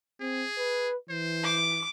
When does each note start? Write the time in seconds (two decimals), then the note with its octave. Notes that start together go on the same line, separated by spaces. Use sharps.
0.21 C4 G#4
0.58 B4
1.10 E3 C5
1.44 D6